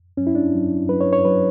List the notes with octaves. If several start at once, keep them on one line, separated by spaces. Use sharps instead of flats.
G2 F#3 C#4
E4
D4
G2 F#3
G2 F#3 B4
C#5
C#5
F#3 B4